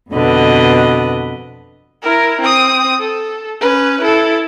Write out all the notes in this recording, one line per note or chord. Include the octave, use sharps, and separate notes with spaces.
F2 B2 D3 B4 D#5
E4 A#4
C4 D#6
A4
C#4 B4
E4 A4